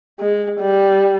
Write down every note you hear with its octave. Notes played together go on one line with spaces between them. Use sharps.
G#3
G3